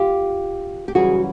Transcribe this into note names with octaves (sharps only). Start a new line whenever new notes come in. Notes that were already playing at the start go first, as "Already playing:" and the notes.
Already playing: F4 G4
G4
F#2 C#3 E3 G3 F#4 G#4